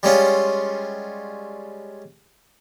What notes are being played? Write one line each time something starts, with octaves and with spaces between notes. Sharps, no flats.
G3 G#3 C#4 F4